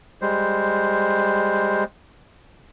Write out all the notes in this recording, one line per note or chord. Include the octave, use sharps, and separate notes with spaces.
G3 G#3 C5